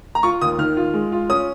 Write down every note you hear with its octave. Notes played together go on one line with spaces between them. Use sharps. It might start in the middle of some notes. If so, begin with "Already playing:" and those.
A#5
F4 C#6
D#2 D#6
D#3 F6
F4
G#3
F4
C#4 D#6